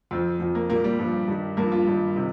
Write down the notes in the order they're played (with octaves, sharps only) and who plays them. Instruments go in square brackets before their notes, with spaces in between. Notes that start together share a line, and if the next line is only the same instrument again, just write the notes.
[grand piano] F2 F3 C4
F2 F3
A#3
A#2 G3 A#3
G3
G2 F3
G2 D#3 G3
G2 F3 A#3
F4
G2 D#3 G3
C3 D#3